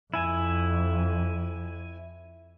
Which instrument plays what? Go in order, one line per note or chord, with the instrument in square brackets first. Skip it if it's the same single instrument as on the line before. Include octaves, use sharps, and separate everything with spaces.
[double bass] F2 [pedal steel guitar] E4 G#5